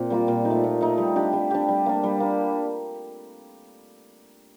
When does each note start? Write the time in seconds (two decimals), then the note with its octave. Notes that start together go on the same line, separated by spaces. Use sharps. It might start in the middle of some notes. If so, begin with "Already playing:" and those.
Already playing: A#2 C4
0.10 G3 A#3 F4
0.28 A#2
0.45 D#4
0.50 A3
0.64 A#2
0.81 A3 D#4
0.98 G3
1.16 D4 G4
1.33 G3
1.51 D4 G4
1.68 G3
1.86 A#3 D4
2.03 G3
2.20 A#3 D4